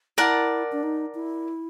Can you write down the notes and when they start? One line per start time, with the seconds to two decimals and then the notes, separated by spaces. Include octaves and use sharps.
0.18 E4 A#4 D5 F#5 A5
0.72 D4
0.83 D#4
1.15 E4